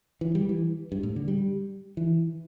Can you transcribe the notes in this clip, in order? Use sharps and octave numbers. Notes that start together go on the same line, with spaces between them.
E3
G3
E3
G2
A2
D3
G3
E3